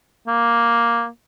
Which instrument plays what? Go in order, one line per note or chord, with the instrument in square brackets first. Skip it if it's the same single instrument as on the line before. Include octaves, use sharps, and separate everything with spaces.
[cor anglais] A#3